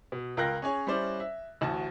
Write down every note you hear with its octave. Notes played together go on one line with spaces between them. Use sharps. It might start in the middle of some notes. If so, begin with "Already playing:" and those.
B2
C#2 F4 A#4 G5 F#6 A#6
C#4 G#4 C#5
G3 C#4 E4 C5 D5
E5
A1 D2 F#4 A5